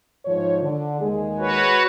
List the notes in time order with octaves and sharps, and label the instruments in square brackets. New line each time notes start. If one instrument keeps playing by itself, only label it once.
[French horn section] G#2 F3 C#5
D3
D#2 G#3 G#4
[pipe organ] F#4 B4 C#5